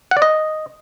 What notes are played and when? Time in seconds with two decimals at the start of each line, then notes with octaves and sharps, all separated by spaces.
0.11 F#5
0.17 D5
0.22 D#5